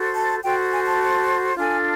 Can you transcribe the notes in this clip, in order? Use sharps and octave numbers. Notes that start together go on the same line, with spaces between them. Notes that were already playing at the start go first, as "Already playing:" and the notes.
Already playing: F#4 A4 C5
A5
F#4 A4 C5 G5
G#5
A5
D4 F4 A4 G#5